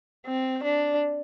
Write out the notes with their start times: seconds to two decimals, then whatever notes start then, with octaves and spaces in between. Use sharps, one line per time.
0.27 C4
0.64 D4